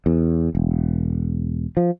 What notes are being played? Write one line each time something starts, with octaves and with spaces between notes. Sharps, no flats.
E2
E1
F3